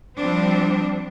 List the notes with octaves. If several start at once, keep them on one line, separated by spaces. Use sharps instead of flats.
F3 G3 C4 D4